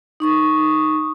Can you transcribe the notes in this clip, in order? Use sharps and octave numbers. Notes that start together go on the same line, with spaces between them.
D#4 C#6 D#6